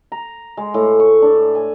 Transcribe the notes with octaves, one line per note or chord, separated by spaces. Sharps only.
A#5
G#3
A2
C#6
D4
G#5